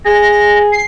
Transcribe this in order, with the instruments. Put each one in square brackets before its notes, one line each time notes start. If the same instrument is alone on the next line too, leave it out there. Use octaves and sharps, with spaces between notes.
[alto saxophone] G#4 [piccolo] A#6
[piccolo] C7